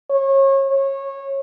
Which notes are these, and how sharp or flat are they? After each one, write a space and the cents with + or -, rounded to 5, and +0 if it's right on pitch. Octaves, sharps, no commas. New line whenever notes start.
C#5 -30
C#5 -20